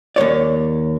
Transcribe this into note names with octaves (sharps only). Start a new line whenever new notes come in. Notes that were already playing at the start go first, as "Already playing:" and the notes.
D#2 F3 C#5 D5